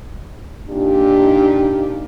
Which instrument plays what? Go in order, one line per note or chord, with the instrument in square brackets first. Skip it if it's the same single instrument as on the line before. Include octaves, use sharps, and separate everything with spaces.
[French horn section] A#2 D4 D#4 G4